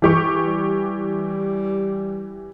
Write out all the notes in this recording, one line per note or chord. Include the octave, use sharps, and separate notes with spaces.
E3 G4 C#6
G3